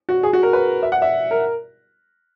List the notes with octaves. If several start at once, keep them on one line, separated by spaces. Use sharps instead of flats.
F#4
G#4
F#4
A#4
B4
E5
F#5
E5
A#4